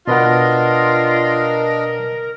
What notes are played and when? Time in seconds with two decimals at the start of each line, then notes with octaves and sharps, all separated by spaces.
0.07 B2 D4 F4 A#4 B4 D#5 F#5